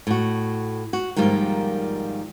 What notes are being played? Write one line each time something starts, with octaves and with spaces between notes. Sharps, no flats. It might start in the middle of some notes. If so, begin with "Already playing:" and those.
A2 F#4
F#4
G#2 D#3 F3 G3 A#3